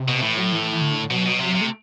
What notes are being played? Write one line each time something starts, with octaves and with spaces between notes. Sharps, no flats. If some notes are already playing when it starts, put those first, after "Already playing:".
Already playing: C3
B2
A2 E3
F#3
E3
E3
D3
B2 F#3
B2
C3
C3
A3